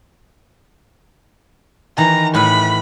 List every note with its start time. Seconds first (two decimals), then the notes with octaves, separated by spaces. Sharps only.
1.98 D#3 E3 A#5
2.35 A2 B4 B5